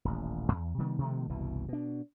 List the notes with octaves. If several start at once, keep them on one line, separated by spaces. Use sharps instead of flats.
D#1 A1
E2
C3 D#3 G3 B3
B2 D#3 F3 A3
F#1 C2 B2 E3
B2 D4